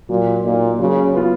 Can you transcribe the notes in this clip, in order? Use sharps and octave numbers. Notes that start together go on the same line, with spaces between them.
A#2 F#3
A#2 A#3 D#4
C#3 F#3
B3 F4